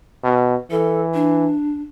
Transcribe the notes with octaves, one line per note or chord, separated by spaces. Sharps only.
B2
E3 A4
D4